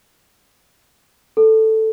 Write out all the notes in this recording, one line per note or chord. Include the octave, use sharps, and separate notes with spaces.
A4